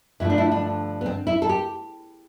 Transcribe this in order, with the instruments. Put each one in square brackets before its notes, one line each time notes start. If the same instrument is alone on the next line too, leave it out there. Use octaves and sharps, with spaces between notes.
[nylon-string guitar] G2 D3 F3 A3 E4
D4
E4
D4
B3
C4
E4
A4
G4